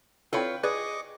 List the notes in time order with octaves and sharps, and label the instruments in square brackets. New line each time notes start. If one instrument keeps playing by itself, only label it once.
[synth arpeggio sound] C4 E4 A4 [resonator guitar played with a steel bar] F4 B4 C#5 [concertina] G5
[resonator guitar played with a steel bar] G#4 [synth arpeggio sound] B4 D5 [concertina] D#5 C#6 D6